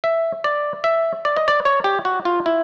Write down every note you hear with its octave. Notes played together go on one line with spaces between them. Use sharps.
E5
D5
E5
D5
D#5
D5
C#5
G4
F#4
F4
E4